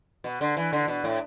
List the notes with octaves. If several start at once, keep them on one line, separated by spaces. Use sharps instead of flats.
B2
D3
E3
D3
B2
A2